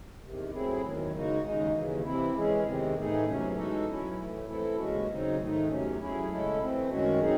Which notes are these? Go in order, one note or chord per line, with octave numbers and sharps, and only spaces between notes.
E2 C3 D#3
A2 F#3 C4 E4 G#4
E2 D#3 F#3
C#3 G#3 D#4 F#4
D#2 C#3 G#3 D#4
D#2 C#3 E3
C3 E3 C4 E4
E3 G#3 C#4 G#4
E2 C3 D#3 G#3 C4
A2 E3 A3 D#4 G#4
E2 C3 F#3 C#4
E3 G#3 D#4 F#4 A4
F#3 C#4 E4
A2 E3 A3
E3 C4 E4 A4
D#2 C#3 G#3 C#4 F#4
C#3 F#3 C4 D#4
G#2 D#3 A3 D#4
E2 C3 F#3 C#4
F#3 A3 C#4 E4 G#4
C#3 G#3 C#4 E4 A4
E3 A3 C4
F#2 D#3 G#3 C#4 F#4
F#3 C4 D#4 G#4